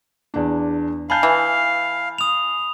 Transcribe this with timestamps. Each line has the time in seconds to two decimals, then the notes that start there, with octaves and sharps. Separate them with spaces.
0.34 E2 D4
1.10 F5 G#5 A5 B5 G6
1.23 E3
2.18 D#6 F7